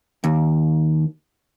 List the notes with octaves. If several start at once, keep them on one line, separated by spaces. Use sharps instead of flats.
D#2